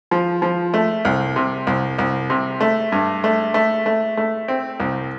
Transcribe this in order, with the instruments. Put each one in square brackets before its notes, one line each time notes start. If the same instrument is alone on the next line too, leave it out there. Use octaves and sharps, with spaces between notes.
[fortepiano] F3
F3
A3
C2
C3
C2
C2
C3
A3
G2
A3
A3
A3
A3
C4
C2